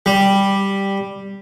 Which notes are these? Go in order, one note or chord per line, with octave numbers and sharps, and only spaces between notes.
G3